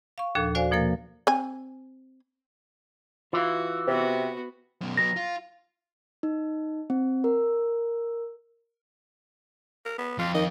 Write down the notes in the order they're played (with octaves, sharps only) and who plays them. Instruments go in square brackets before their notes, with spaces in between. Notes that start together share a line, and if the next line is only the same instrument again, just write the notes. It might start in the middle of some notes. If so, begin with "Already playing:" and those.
[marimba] F5 C#6
D#2 A#2 F3 D4 A4
F#4 C5 D5 F5 G#5
B2 F3 A#3 A#4 A6
[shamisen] C4 G#5
[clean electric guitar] E3 [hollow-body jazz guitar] F4 F5 [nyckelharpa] F#4
[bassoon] C3 [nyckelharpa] B3 F#4
[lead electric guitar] F#2 B2
[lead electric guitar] F#3 B3 [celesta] A#6
[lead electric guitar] F4
[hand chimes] D#4
C4
A#4
[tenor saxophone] A#4
B3
[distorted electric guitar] F2 [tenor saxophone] F4
[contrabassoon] D#3 [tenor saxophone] D#5